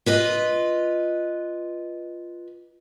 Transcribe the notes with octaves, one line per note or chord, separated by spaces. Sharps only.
F4 B4 D#5